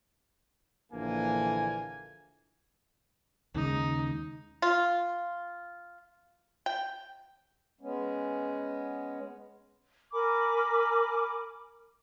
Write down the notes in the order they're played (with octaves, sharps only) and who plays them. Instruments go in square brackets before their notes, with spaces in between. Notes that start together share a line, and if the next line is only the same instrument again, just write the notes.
[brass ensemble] A#1 D3 E3 A#3 G#5
[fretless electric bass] D#2 C#3 G#3 [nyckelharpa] D#4
[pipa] F4
G5
[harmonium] G#3 B3 C#4
[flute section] A#4 G#5 B5 D6